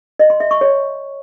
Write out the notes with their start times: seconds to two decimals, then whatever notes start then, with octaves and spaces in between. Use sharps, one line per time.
0.19 D#5
0.30 C6
0.40 E5
0.51 C#6
0.61 C#5